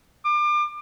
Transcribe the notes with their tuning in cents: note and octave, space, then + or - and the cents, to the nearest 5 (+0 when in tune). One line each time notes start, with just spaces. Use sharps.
D6 +30